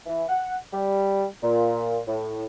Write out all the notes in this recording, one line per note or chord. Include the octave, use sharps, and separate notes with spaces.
E3
F#5
G3
A#2
A2